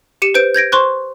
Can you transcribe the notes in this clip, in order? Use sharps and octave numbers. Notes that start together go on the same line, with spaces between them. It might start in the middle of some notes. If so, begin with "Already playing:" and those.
G4 C#7 D#7 E7
B4 C5 G6 D7
G6 G#6 A#6 D7
C5 C6 C#6 F#6